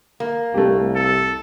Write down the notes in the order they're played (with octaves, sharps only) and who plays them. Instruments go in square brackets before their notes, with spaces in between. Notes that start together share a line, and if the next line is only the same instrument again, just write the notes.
[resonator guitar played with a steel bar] A#3
[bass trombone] C2 [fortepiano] A3 G4
[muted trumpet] A4